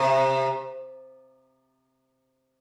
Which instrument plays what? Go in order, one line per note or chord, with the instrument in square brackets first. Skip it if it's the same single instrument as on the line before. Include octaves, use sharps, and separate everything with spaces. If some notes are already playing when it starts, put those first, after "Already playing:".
Already playing: [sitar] C3